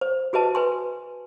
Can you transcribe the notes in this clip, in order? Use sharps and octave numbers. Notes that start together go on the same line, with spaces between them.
C5
F#4 G#4 B4 D#5 A5
B4 G#5 C6